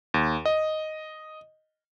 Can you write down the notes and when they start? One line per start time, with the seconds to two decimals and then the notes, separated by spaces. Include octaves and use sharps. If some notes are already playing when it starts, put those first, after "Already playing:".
0.14 D#2
0.45 D#5